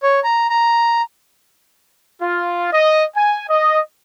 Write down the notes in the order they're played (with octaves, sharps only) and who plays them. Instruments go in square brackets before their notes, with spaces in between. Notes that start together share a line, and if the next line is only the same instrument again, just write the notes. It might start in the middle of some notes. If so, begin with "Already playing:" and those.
[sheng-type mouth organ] C#5
A#5
A#5
[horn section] F4
D#5
G#5
D#5